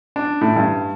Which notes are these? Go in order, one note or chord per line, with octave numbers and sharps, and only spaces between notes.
D4
A2
G2